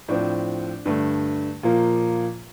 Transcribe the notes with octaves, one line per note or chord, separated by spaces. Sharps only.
A2 F3 C4 D4
G2 D3 A3
A#2 F3 A#3